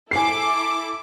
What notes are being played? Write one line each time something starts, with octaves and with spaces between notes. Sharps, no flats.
E4 A4 G#5 D6 C7